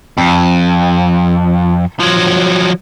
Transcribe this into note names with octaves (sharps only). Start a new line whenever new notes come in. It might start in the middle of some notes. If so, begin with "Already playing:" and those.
F2
F3 F#3